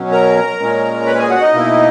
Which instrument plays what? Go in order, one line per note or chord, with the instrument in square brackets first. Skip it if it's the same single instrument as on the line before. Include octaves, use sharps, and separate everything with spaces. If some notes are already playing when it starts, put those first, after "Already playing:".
Already playing: [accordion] B2 F#3 C#4
A#4 A#5
A#2 G#3 C#4
B4 B5
G#4 G#5
F#4 F#5
D#4 D#5
B2 A#3 E4